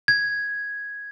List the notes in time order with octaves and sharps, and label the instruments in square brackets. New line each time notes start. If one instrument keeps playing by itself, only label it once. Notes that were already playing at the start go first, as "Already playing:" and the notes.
[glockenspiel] G#6